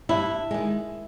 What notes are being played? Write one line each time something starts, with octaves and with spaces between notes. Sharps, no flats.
G2 E4
D#3 G#3